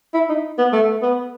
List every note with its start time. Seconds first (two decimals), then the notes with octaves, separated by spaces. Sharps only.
0.14 E4
0.29 D#4
0.58 B3
0.73 A3
1.03 B3